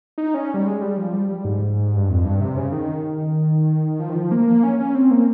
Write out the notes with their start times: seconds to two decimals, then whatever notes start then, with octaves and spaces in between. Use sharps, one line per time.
0.18 D#4
0.34 C#4
0.54 G3
0.66 G#3
0.82 G3
0.98 F3
1.13 G3
1.29 G3
1.45 G#2
1.97 G2
2.09 F2
2.25 G2
2.41 C3
2.56 C#3
2.72 D#3
4.00 F3
4.09 D#3
4.15 F3
4.31 A#3
4.47 A#3
4.63 C#4
4.79 C#4
4.95 C4
5.11 A#3